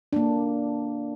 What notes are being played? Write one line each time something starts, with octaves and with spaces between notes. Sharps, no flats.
A#3 D4